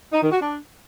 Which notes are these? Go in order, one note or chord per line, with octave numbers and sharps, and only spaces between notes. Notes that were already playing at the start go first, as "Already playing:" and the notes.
D#4
D#3
F#4
D4